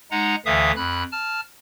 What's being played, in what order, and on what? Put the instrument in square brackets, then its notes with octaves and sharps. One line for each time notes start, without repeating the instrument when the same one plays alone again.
[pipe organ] G#3 D#4 F#5 A#5
D2 D3 E3 E5 F5 D#6
F2 B5 F#6
A5 F6